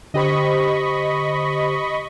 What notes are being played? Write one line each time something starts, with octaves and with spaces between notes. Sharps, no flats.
D3 G4 C5 D#5 B5 C#6